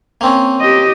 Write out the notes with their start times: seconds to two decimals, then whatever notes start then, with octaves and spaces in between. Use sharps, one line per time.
0.21 A#3 C4 C#4
0.61 G4 D#5